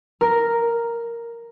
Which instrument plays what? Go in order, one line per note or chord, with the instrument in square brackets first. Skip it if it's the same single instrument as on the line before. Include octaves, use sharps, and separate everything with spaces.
[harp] A#4